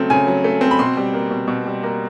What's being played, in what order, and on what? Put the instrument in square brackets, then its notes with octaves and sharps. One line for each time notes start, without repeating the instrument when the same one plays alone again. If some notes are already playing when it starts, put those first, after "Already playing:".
Already playing: [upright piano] C#3 F#3 A3 C4
C#3 G#5
F#3
A3
C4
B5
B2 C6
G3
A#3
B2
B2
G3
A#3